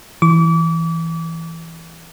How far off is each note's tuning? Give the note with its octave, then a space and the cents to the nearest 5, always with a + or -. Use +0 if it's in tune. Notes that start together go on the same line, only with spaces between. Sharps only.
E3 +0 D6 -35